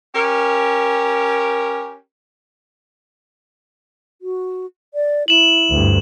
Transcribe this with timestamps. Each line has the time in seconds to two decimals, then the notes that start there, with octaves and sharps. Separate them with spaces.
0.15 C#4 G4 A#4
4.22 F#4
4.94 D5
5.28 E4 E7 F#7
5.70 D2 G2